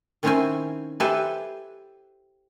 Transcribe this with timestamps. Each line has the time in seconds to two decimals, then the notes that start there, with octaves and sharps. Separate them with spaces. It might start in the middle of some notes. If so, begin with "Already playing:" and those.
0.23 D#3 C4 C#4 E4 C5 G#5
1.00 G4 A4 B4 C5 E5 G#5